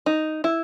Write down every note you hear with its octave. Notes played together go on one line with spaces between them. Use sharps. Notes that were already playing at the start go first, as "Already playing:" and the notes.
D#4
E4